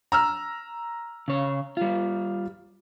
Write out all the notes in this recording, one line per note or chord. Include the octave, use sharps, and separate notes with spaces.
A#5 E6 F6
C#3 C#5
G3 F4